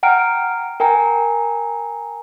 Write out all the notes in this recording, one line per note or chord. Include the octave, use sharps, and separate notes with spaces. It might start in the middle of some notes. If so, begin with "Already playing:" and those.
F#5 G5 A#5 F6 D7
A#4 G5 G#5 A#5